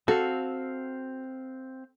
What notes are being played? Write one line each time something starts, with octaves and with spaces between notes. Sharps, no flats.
C4 F#4 A4 F5